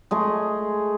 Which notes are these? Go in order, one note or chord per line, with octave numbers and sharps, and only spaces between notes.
G#3 A3 G#4